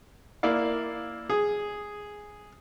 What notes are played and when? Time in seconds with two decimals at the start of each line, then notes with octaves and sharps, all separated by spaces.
0.43 A#3 E4 D5 F5
1.30 G#4